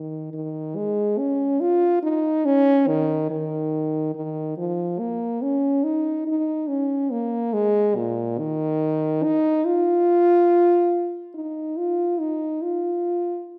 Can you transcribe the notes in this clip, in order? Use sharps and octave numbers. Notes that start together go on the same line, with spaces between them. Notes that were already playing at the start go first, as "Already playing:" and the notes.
Already playing: D#3
D#3
G#3
C#4
F4
D#4
C#4
D#3
D#3
D#3
F3
A#3
C#4
D#4
D#4
C#4
A#3
G#3
A#2
D#3
D#4
F4
D#4
F4
D#4
F4